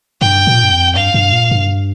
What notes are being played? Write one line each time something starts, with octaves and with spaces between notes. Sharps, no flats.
G2 G5
A#2
G2
F2
G2 F5
G2
A#2
G2